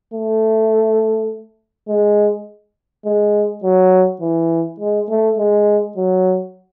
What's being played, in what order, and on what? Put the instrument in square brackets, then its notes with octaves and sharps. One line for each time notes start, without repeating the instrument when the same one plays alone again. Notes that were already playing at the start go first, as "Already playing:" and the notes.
[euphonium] A3
G#3
G#3
F#3
E3
G#3
A3
G#3
F#3